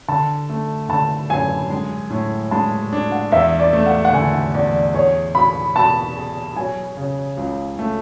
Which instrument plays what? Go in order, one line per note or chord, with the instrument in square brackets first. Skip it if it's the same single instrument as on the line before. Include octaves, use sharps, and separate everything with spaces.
[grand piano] D3 [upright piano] A5
[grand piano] A3
[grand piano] D3 [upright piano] A5
[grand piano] F#2 [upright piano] G#5
[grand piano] G#3
A2
[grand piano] G#3 [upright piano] A5
[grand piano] D4
[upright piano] F#5
[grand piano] E2 [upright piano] E5
[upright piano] D5
[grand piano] A3
[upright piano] F#5
F#5
[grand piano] D3 [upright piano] G#5
[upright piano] F#5
[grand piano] E2 [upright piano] D5
[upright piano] D5
[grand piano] G#4 [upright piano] C#5
[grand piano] B2 [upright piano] B5
[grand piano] B2 [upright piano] A5
[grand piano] G#4
[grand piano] F#3 [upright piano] G#5
[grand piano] C#3
C#2
A3